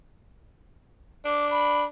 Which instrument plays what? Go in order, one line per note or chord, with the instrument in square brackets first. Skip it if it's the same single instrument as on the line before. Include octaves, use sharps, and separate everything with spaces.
[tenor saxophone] D4 [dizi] D6
[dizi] B5